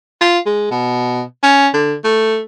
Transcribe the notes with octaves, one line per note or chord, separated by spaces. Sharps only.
F4
G#3
B2
C#4
D3
A3